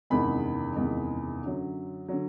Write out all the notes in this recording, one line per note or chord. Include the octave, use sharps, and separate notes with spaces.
F#1 E2 C3 D#3 G#3 B5
F#1 E2 C3 D#3 G#3
F#2 D3 F#3
D3 F#3